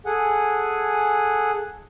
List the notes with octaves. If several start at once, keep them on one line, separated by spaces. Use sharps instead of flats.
G#4 A4 F#5 G#5